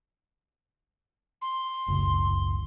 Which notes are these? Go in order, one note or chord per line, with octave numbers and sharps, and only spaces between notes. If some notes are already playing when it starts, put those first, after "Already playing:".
C6
F#1 C#2 A2